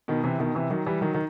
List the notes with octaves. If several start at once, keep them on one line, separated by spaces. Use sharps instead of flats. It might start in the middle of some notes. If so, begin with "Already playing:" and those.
B2 D#3
C3 E3
B2 D#3
C3 E3
D#3 F#3
E3 G3
D#3 F#3
D#3